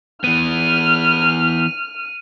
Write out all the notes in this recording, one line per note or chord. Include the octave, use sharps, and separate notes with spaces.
E3 B3 F6 D#7